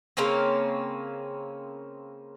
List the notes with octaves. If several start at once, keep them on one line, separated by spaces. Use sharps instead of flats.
C#3 A#3 C4 C#4